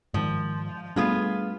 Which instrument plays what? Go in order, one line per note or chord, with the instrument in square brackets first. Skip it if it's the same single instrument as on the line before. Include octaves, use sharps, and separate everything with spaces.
[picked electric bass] G#2 D#3 [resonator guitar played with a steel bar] F3
[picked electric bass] G3 A3 D4 [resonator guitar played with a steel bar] B3 F4 G#4